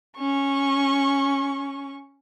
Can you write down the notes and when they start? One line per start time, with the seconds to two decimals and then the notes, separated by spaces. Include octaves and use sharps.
0.18 C#4 C#6